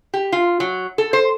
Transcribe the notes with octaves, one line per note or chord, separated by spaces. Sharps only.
G4
F4
F#3
A4
C5